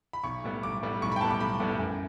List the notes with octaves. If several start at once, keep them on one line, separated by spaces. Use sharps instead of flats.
B5
B1 C#6
A2 G3 B3
B1 D6
A2 G3 B3
B1 C#6
B5
G5
A2 G3 B3 A5
D6
B1 B5
A2 G3 B3
F#2